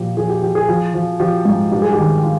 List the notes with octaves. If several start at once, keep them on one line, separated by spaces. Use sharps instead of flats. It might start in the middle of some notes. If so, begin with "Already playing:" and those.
Already playing: A#2 F3 G4
F3 G#4
G4
F3 G4
G#4
F3
F3
F3 G4
G#2
G2 G4
G#4
G4
D#3
F4